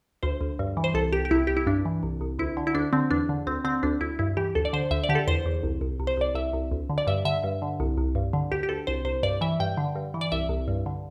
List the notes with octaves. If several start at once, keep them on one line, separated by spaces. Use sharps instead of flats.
D2 C5
D2
G2
E3
C5
C2 A4
C2 G4
G4
C2 E4
C2 G4
E4
G2 D4
E3
C2
C2
D2 E4
D3
E4
D2 D4
D3 C4
E2 D4
D3
D2 C4
D3 C4
D2 D4
D2 E4
G2 E4
E3 G4
D2 A4
D5
D3 C5
D2 E5
D5
D3 G4
A4
E2 C5
E2
C2
C2
C2
C5
C2 D5
C2 E5
C2
D2
D3
D5
G2 E5
D3 E5
G2
D3
C2
C2
G2
D3
D2 G4
G4
D2 A4
C2 C5
C2 C5
G2 D5
E3 E5
G2 G5
D3
G2
E3
D5
C2 E5
C2
G2
D3